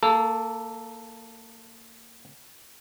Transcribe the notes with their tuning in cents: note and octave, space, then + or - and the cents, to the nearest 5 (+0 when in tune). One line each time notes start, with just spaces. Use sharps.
A#3 -25 A4 +0